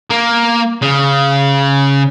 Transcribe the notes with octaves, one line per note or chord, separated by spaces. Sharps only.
A#3
C#3